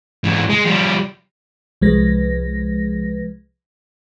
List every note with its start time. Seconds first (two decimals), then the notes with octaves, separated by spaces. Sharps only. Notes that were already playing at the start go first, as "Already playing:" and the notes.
0.24 G#2 E3
0.50 G#3
0.65 F3 G3
1.81 C2 F3 G#3 B4 A#6